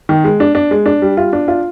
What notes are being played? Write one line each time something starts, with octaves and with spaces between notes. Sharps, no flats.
D#3
G#3
D4
D4
G#3
D4
G3
F4
D4
F4